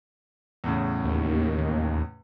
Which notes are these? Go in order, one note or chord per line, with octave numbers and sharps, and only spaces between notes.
E2 A2 C#3
D#2